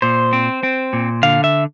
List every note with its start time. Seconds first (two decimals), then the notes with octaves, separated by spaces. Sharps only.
0.02 A#2 C5
0.33 C4
0.63 C4
0.93 A#2
1.23 D3 F5
1.44 E5